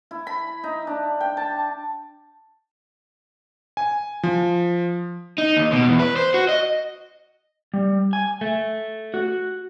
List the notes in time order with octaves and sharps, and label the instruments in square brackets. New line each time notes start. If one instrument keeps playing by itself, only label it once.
[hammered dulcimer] E4
B5
D#4
D4
G5
A5
[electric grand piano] G#5
F3
[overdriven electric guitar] D#4
D#2
B2
E2
B4
C5
F#4
D#5
[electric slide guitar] G3
G#5
A3
F#4